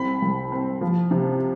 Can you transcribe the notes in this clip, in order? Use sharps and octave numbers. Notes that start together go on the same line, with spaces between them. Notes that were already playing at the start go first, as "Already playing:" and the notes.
Already playing: C2 C4 B5
C2
C4
F3
C3